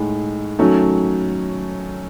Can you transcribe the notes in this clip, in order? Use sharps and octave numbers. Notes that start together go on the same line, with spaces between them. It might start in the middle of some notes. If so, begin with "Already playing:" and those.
Already playing: A2 G#3 D#4
D#3 F#3 A3 C#4